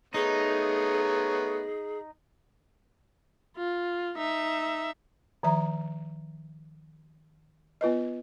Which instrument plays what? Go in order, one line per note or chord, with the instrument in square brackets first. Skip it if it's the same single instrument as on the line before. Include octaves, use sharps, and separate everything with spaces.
[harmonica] A3 B3 C#5 [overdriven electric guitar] D#4 [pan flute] G#4
[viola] F4
D#4 E5
[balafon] D#3 F3 E5 A#5
B3 F4 B4 D#5